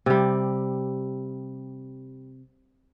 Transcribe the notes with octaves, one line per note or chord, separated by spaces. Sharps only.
C3 G3